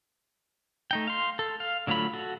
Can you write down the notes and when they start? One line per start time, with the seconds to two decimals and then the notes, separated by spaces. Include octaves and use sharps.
0.91 A3 D#4 G5
1.07 F5 C6
1.39 A4
1.60 F5
1.87 D3 F#3 A3 F4 B5
2.13 F#4 A4